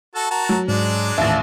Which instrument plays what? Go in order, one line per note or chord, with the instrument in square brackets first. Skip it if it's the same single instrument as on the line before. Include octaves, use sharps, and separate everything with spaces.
[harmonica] F#4 A4 A5
F#4 A#4 A5
[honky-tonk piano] F#3
[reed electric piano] G#2 [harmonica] G#3 D4 D5
[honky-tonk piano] A1 D#2 [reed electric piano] E5